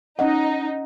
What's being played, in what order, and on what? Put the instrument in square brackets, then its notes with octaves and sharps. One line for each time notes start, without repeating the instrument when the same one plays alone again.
[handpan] C#4 D#5 F#5 [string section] D#4